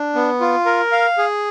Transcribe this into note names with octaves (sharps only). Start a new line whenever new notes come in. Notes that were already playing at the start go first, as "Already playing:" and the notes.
Already playing: D4
B3
F4
A#4
F5
G#4